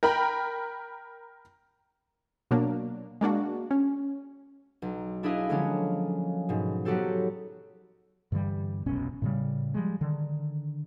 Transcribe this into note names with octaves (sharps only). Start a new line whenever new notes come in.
A#4 G5 A#5 B5
B2 F#3 A#3 D4
G#3 A#3 D4 F#4
C#4
B1
D4 E4 G#4 B4 D#5 F5
D3 F3 F#3 G#3 A#3 C#4
G#2 B2
F#3 B3 F#4 G4 A4 C5
G2 D3 E3 G3
F1 B1 B2 C#4
A2 C#3 G3
F3 G3 G#3
D3 D#3